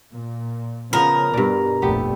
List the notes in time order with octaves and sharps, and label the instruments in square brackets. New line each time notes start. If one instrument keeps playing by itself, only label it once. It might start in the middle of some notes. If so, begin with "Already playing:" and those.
[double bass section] A#2
[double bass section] C#3 [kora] F3 B3 [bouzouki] A#4
[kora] G2 D5 [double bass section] B2
[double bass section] F1 A#1 A3 [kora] B3 G4